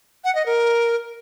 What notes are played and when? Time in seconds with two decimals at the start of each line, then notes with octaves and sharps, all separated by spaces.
0.24 F#5
0.35 D#5
0.46 A#4